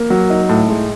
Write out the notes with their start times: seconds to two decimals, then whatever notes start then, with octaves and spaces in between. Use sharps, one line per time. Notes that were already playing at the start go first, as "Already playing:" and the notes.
Already playing: A#3
0.10 F#3
0.30 D#4
0.49 A2
0.68 G#3